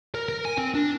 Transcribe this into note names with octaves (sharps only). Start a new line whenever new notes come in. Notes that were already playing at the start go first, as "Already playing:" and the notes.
A#4
A#4
G#5
C4
D4